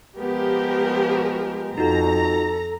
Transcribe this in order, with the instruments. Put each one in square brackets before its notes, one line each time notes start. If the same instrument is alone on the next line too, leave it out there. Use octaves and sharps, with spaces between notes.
[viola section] F3 G4 A#4 [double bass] G#3 B3
[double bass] F2 [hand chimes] D#4 F4 F#4 [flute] A4 [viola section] A#5